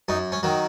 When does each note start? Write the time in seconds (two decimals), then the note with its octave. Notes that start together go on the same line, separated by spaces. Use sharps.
0.08 F#2 D#4
0.32 C#4
0.43 D#3 F#3